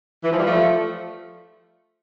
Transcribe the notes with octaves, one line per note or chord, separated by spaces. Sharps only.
E3
F3
G3
F3 A3